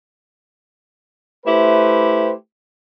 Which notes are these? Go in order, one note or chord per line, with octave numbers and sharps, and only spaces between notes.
A3 E4 G4 B4 C5